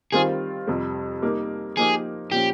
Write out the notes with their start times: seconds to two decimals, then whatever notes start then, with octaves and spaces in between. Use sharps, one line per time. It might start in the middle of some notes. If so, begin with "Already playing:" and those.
0.12 D#3 G3 C4 F4 G#4
0.68 F2 C3 G3
1.22 G3 A#3 D#4 G4 A#4
1.77 F3 A#3 D#4 G4 G#4 A#4
2.32 A#2 F3 A#3 C#4 G4